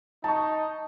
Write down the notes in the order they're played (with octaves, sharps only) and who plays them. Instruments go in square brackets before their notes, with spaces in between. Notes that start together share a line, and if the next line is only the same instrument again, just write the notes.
[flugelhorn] D#4 [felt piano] A5 C#6